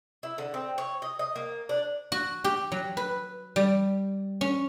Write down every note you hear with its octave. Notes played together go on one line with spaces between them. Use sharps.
E4
D3
C4
C#5
D#5
D#5
A#3
D4
F#4
G4
F#3
B4
G3
C#4